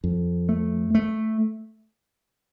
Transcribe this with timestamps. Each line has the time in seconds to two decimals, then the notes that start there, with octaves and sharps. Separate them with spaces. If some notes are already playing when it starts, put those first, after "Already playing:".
0.04 F2
0.49 A3
0.95 A3